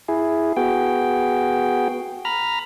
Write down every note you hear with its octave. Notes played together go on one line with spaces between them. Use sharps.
E4 G#4
B3 F#4 G#4 G5
A#5 B5 F6